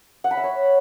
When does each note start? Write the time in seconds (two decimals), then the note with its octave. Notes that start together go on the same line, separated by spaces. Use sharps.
0.24 F#5
0.31 B5
0.37 E5
0.44 C#5